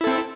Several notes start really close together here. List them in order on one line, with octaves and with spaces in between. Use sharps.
E4 A4 C4